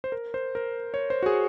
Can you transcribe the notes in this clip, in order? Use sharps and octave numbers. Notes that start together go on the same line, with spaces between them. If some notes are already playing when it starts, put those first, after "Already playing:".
C5
A#4
C5
A#4
C#5
C5
F#4
G#4